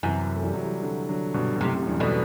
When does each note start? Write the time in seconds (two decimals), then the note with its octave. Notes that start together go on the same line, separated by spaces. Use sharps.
0.03 F#2 C3 E3
0.34 A3
0.43 E3 G3
0.54 F#3
0.62 E3 G3
0.83 D3 F#3
1.09 D3 F#3
1.34 G2 B2
1.56 B2
1.60 F#2 A2 C3
1.83 F#2
1.87 E2 G2
2.00 B2 D3